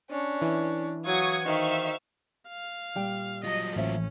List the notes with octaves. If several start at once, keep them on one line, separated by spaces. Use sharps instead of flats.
C#4 D4
E3
F#3 F5 F#5 C#6 D#6 G#6
D#3 C5 E5 F5 C#6
F5
A#2 G3 G5
F#3 F4 D#5
A1 A2 A#3 C#4 C5 E5